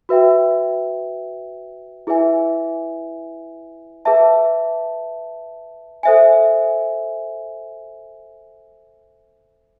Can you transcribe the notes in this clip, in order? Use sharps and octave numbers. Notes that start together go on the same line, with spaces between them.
F#4 B4 E5 G5
E4 G#4 B4 E5 G#5
G#4 B4 E5 A5
A4 C5 E5 G#5